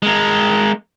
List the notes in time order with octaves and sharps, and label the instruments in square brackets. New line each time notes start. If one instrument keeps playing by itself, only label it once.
[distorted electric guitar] G#3 A#4